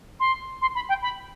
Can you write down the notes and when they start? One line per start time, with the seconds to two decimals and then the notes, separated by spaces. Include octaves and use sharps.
0.20 C6
0.61 C6
0.75 B5
0.89 G5
1.02 B5